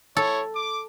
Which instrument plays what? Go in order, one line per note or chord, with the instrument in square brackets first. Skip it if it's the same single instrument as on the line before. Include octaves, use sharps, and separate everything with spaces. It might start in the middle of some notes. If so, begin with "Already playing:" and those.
[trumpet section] E4 C#5 [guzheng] A4
[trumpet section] D6